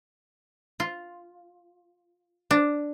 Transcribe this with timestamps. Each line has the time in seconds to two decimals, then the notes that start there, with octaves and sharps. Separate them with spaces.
0.80 F4
2.51 D4